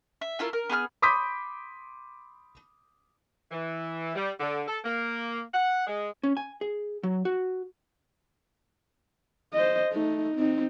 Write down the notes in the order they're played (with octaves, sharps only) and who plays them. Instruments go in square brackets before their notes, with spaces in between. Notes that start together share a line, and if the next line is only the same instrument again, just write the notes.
[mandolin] E5
A3 E4 F4 A#4
A#4
B3 G#4 G#5 F6
[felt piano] B5 C6 D6 D#6 G6 B6
[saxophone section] E3
G3
D3
A4
A#3
F#5
G#3
[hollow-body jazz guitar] C#4
G#5
G#4
F#3
F#4
[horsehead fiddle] C5 D#5
A3 D#4
C4 D#4